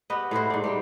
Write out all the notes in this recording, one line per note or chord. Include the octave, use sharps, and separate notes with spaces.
B3 G4 B4 D#5
A2 E4 F#4 C5
G#2 D4
G3 C5 G5